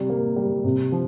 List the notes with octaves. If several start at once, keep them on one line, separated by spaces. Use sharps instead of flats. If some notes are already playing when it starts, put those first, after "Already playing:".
Already playing: C3 G3
A#3
G3
C3
F3